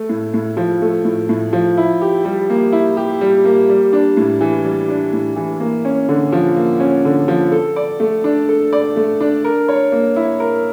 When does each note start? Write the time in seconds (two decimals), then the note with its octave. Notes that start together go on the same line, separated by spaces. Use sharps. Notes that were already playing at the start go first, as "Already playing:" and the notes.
Already playing: A3
0.09 A2
0.34 A2
0.57 F3
0.81 A3
1.05 A2
1.29 A2
1.53 F3
1.77 E4
2.02 G4
2.25 G3
2.50 A#3
2.72 E4
2.97 G4
3.21 G3
3.45 A#3
3.69 G3
3.93 D4
4.17 A2
4.41 E3
4.65 G3
4.88 D4
5.13 A2
5.36 E3
5.60 A#3
5.85 C#4
6.09 D3
6.32 F3
6.56 A#3
6.80 C#4
7.05 D3
7.28 F3
7.52 A4
7.76 D5
8.00 A3
8.24 D4
8.49 A4
8.73 D5
8.96 A3
9.21 D4
9.44 A#4
9.68 C#5
9.92 A#3
10.16 E4
10.40 A#4